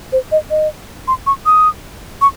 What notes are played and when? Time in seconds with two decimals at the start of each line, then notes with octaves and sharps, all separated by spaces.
0.12 C5
0.32 D#5
0.50 D#5
1.08 C6
1.27 C#6
1.46 D#6
2.21 C#6